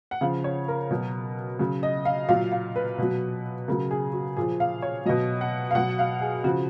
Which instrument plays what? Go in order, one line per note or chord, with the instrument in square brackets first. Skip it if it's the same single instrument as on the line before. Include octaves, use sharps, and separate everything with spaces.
[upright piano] F#5
C#3 F3 F5
C#5
A#4
B2 F#3
C#3 F#3
D#5
F5
A#2 F#3 F5
F5
B4
B2 F#3
C#3 F#3 A#4
G#4
F#4
A#2 F3 G#4
F5
C#5
B2 F#3 D#5
F#5
F5
B2 F#3 F#5
F5
G#4
C#3 F3 F#4